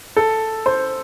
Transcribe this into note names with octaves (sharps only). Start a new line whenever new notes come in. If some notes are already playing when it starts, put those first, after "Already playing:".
A4
C5